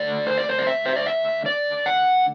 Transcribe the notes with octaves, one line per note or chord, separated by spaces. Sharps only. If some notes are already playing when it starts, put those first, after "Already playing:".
Already playing: D3 A3 D5
C5
D5
C5
D5
E5
C5
D5
E5
D5
F#5